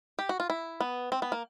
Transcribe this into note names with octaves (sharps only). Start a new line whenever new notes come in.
G4
F#4
F4
E4
B3
C4
B3
A#3